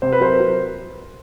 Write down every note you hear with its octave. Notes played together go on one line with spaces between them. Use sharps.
C3 C5
B4
F#3 A#4 C5
F#3